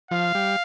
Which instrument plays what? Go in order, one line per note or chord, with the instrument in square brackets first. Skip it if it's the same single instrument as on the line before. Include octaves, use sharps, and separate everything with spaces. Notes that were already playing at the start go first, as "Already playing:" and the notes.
[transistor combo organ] F3 [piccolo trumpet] F5
[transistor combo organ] G3